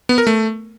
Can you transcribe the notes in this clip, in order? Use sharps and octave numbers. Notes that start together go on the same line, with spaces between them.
B3
A#4
A3